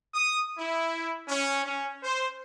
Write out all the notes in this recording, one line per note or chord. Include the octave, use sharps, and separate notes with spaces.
D#6
E4
C#4
C#4
C5